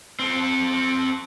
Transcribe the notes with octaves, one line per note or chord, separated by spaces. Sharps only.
C4 A4